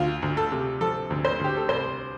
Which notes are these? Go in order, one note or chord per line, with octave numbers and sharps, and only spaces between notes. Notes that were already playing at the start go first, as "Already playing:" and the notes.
Already playing: D2 F4
D2
A4
C3
F3 A4
D2
C5
D2 G4
A4
C2 C5